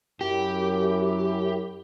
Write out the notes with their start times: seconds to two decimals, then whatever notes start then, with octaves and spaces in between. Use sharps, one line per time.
0.21 F#2 E4 G4